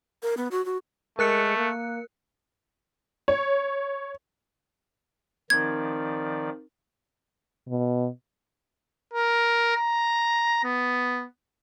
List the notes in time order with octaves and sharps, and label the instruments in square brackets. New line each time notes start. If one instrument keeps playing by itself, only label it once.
[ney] A#4
B3
F#4
F#4
[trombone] G#3 [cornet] A3 [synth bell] A#4 F#6 C#7
[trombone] A#3
[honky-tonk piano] C#5
[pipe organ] D#3 F3 D5 [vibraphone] C4 D#4 A#4 [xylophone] G#6
[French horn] B2
[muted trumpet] A#4
A#5
B3